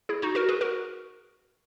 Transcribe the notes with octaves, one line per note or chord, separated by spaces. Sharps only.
E4 G#4
D#4 F#4
F#4 A#4
G#4 B4
F#4 A#4